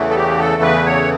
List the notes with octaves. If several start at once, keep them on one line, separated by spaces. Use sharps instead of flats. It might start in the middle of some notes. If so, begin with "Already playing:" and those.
Already playing: E2 C#3 E3 A3
A4
G4
A4
B4
C#5